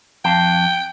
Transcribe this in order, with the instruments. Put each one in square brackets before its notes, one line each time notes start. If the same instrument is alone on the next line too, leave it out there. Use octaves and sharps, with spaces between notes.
[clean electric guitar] F2 F5 A5 [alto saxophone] G5